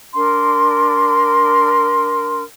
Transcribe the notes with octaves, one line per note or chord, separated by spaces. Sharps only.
D4 A#4 C6